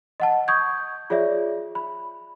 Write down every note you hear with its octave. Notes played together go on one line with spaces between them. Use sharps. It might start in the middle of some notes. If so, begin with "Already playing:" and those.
D#5 F#5 A5
C#6 D#6 G6 G#6
F4 G#4 C#5 D5 E5
B5